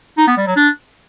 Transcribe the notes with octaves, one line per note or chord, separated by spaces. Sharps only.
D#4
B3
G3
F#3
D4